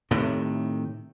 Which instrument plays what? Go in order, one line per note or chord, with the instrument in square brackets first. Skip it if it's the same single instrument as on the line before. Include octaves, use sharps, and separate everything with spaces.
[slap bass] A2 C3 D#3